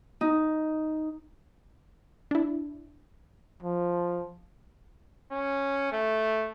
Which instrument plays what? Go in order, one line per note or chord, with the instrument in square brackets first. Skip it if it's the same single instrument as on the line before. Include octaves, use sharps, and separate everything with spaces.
[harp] D#4
[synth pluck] D4 E4
[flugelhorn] F3
C#4
A3